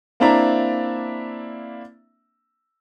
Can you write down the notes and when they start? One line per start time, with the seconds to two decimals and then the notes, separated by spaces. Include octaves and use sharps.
0.20 A#3 C4 D4 E4 E5 A#5